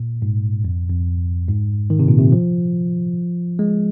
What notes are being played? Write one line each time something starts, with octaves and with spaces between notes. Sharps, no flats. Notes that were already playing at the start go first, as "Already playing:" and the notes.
Already playing: A#2
G#2
F2
F2
G#2
D#3
C3
A#2
C3
F3
G#3